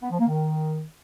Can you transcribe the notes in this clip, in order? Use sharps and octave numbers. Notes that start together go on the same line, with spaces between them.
B3
F3
A#3
D#3